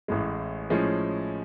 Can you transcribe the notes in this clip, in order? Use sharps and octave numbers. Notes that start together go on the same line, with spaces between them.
A1 A2 G#3
A2 F3 G#3 C#4